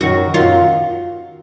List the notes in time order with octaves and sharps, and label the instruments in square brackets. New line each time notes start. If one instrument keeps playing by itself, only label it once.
[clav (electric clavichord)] F#2 D#3 F#3 [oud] F#4
[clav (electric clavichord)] F#2 D#3 F#3 [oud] F4